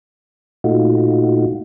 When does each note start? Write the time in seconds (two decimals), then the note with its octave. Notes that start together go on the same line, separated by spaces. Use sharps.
0.64 A#2 A3 D#4 F4 F#4